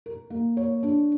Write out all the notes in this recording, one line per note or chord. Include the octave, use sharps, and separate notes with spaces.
A#4
A#3
C#5
D4